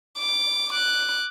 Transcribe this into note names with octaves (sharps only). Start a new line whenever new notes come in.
D6
D6 F#6